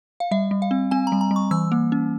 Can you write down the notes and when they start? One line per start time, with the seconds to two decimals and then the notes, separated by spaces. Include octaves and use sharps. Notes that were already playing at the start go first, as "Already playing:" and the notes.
0.20 F5
0.31 G3 E5
0.51 G3
0.62 F5
0.71 C4
0.91 C4 G#5
1.07 A#5
1.12 G3
1.21 A#5
1.31 G3
1.36 C#6
1.51 E3 E6
1.72 A#3
1.92 C#4